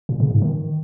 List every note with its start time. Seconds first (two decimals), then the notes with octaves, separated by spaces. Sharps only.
0.09 A#2
0.20 C#3
0.31 G#2
0.42 D#3